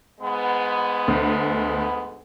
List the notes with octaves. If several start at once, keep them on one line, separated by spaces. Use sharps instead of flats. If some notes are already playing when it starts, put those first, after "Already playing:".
G#2 G#3 B3
D2